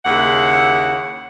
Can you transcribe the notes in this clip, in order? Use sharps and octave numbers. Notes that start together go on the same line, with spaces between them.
D#2 C#3 E4 F#5